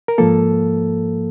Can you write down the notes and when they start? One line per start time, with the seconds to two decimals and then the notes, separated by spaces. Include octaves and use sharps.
0.08 A#4
0.18 G#2 F3 A#3 A4